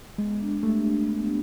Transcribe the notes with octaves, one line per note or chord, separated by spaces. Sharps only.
G#3 B3
D4
A3 G4
D4
B3